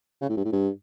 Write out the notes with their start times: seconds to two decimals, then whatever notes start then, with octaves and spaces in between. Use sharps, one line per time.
0.22 C#3
0.29 A2
0.37 G2
0.45 A2
0.52 G2